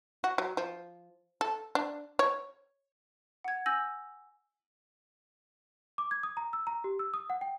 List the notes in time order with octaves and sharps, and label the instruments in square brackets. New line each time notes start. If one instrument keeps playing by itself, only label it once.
[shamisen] F#4
F#3
F3
A4
D4
C#5
[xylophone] F#5 G#6
G#5 E6 G6 A#6 F#7
[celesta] D6
G#6
D#6
A#5
E6
A#5
G4
E6
D#6
F#5
G5